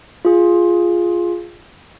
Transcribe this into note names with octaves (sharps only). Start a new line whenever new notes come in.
F4 G#4